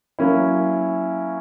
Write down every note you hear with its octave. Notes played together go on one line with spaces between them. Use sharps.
F#3 A#3 C#4 E4